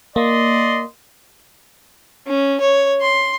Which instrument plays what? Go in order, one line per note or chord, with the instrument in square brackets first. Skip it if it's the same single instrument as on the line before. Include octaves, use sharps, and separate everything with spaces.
[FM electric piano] A#3 [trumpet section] D5 D#5 C6
[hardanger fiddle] C#4
C#5
C6